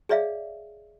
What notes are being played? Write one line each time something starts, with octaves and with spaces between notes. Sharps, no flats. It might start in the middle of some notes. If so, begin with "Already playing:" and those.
G#4 C#5 D5 E5 F5